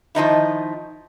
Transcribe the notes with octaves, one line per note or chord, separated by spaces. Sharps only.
D#3 F3 D#4 E4